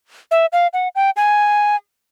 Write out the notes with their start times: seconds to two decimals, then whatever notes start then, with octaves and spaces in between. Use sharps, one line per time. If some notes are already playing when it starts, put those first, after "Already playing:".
0.31 E5
0.53 F5
0.73 F#5
0.95 G5
1.17 G#5